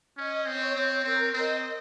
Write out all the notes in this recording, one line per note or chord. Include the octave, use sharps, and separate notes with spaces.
C#4 D#5
C4 C#5
C4
C4 A#4
C4 D#5